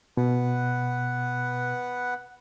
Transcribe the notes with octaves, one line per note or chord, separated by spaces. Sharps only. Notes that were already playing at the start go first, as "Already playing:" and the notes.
B2 B3 B4 F#5